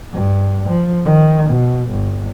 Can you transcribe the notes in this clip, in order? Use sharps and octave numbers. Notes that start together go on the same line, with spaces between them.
G2
F3
D#3
B2
G1